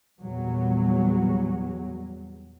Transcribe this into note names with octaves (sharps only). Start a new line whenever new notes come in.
E2 A#2 F#3 G3